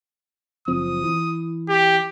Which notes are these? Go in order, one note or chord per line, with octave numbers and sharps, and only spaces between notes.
F#1 F3 C4 D#6
E3
G4